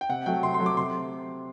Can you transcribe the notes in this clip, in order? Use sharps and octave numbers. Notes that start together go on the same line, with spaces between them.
G5
C3 F#5
F#3 A3 G5
C3 C6
C6
F#3 A3
D6
C3 C6